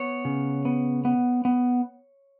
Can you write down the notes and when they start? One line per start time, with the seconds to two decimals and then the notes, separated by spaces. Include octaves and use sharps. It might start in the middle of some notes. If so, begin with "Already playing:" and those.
Already playing: B3 C#5
0.25 C#3
0.65 B3
1.05 B3
1.45 B3